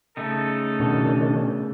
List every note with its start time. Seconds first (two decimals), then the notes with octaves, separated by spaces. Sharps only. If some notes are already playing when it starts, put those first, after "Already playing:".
0.17 C#3 A3 D#4 A4
0.80 B2 D#3 C#4 D4